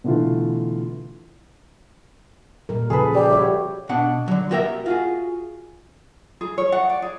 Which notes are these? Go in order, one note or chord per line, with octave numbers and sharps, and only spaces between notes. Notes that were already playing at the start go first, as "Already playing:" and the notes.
B2 D3 E3 A3 F4
A#2 G3 A#4
C#3 F3 G#4 A4 B4
G3 G4
F#4 C#5 E5
B2 D4 F#5
D3 F#3
F#4 G4 A#4 C#5 E5
F4 F#4 G#4
G#4
C#5
F#5
D5
G#4